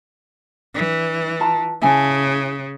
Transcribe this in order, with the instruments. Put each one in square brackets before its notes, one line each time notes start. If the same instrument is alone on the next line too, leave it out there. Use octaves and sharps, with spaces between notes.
[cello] E3 [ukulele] D4
[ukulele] F4 A5 A#5
[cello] C#3 [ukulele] E4 G#5 A5